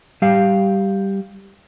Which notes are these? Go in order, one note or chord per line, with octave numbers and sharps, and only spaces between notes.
G3 G4 F5